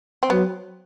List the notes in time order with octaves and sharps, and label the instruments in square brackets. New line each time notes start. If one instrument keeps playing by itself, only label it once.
[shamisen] C4
[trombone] F#3 [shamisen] B3